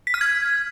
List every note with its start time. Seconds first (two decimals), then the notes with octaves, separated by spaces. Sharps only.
0.07 B6
0.14 F6
0.21 G#6